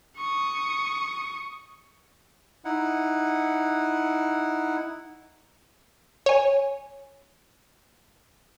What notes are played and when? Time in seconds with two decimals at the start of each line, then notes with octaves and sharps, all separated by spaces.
0.17 C#6 D#6
2.65 D#4 E4 F#5
6.26 C#5 G#5